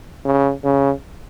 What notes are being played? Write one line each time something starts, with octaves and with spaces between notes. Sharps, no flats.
C#3
C#3